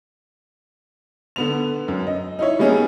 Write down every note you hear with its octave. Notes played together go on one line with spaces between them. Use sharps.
D3 B3 F7
F#2
D#5
D#4 E4 C#5
G3 A#3 B3 C#4 D#4 G#4